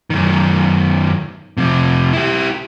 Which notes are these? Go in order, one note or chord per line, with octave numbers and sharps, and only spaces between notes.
F#2 D#3
F2 C3
E4 G4